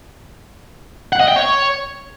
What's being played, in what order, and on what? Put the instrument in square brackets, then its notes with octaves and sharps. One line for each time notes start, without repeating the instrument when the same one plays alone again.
[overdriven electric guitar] F#5
D#5
G5
C#5